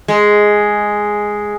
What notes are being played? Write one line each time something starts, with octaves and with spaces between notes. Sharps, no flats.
G#3